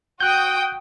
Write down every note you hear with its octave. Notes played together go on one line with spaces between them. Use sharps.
F#4 G5 D#6 F#6 G6